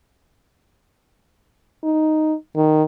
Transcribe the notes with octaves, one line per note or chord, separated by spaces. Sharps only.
D#4
D#3